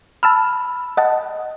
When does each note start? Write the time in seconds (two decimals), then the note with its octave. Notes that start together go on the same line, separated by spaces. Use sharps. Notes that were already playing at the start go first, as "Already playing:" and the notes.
0.23 A5 B5 E6 F6
0.97 D#5 F#5 A5